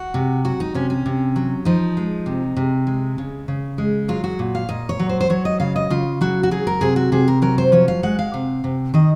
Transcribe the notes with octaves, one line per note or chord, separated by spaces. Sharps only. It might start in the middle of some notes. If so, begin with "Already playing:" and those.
Already playing: F#4
C3
F#3 F#4
D#4
C3 C#4
C#4
C3
F#3
F3 D#4
G#3
C3
C3
G#3
C#3
C#3
G#3
F#3 F4
F#4
A#2
F5
A#2 D#5
C#5
F#3
C5
C5
F#3 C#5
D#5
C#3 F5
D#5
C#3 F4
F#3 F#4
F#4
F#3 G#4
A#4
C3 G#4
F#4
C3 G#4
A#4
F#3 A#4
C5
F3 C#5
F5
G#3 F#5
F5
C3
C3
D#3 D#5